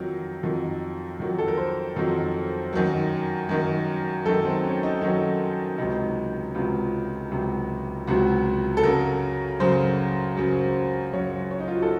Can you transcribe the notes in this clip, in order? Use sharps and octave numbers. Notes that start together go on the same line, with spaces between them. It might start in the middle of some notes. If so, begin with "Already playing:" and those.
Already playing: F2 D#3 F#3 A#4
F2 D#3 F#3
F2 D#3 F#3
A4
A#4
C5
F2 D#3 F#3 A#4
F#2 D#3 F#3
F#2 D#3 F#3
F#2 D#3 F#3 A4
C4
C#4
D#4
F#2 D#3 F#3 C#4
C#2 C3 F#3 D#4
C#2 C3 F#3 F4
C#2 C3 F#3
C#2 C3 F#3 F#4
A4
F#2 C#3 F#3 A#4
F#2 C#3 F#3 C5
F#2 C#3 F#3
F#2 C#3 F#3 C#5
C#5
D#4
F4
F#4
A4